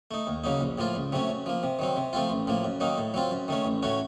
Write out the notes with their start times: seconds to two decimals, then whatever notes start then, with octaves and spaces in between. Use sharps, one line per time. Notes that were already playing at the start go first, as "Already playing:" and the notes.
0.11 A3 D#4
0.27 D#2
0.44 C#3 F#3 A#3 D#4
0.61 A#1
0.78 A2 F3 A#3 F4
0.95 C#2
1.12 C3 F#3 A3 C#4
1.29 F#2
1.46 F3 A#3
1.63 C3
1.79 D#3 F#3 C4
1.96 C3
2.13 F3 A3 C4 F4
2.30 A1
2.47 A2 F3 A#3
2.64 F#2
2.80 D#3 F#3 A#3 D#4
2.98 A2
3.14 F#3 C4 F4
3.31 F#2
3.48 D#3 A3 C#4
3.65 A1
3.83 A2 A3 C#4 F#4